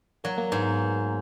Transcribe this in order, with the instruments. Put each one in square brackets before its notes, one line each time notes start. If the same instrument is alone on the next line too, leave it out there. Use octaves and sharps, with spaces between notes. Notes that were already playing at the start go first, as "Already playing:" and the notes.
[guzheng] F#3 [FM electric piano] A#3
[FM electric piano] A#3
[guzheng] G#2 [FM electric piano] B3